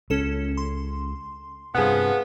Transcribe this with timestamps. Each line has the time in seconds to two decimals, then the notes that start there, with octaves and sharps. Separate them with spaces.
0.10 C#2 C#4 A4 E7
0.57 C6
1.75 G2 C3 F3 B3 G#4 F#5